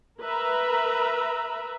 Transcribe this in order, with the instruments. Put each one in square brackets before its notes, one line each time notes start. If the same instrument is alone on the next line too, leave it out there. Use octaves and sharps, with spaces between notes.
[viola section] A#4 B4 E5 A#5 B5